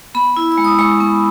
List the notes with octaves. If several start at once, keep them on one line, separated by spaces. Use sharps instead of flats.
B3 B5
E4
E6
G#3
D#6
G#3 C#6
B3